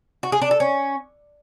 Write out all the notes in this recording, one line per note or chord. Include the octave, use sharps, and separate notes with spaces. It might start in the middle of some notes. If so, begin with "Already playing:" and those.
F#4
G#4
D4
A4
C#4